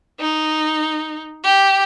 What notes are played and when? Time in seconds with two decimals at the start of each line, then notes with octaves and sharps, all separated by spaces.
0.20 D#4
1.44 G4